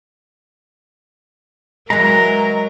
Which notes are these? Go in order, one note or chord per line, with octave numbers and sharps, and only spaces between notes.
E3 F#3 G#3 A#4 A#5